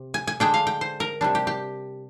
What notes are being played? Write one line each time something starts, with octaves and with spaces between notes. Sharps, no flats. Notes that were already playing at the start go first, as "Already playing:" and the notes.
Already playing: C3
G#5
G#5
D3 G#3 D4 G5
F5
G5
C5
A#4
C3 G3 D4
G4
G4